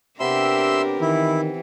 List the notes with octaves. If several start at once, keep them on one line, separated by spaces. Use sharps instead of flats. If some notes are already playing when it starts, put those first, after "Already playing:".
C3 B3 D4 G4 A#4 E5 C6 E6
D#3 E3 E4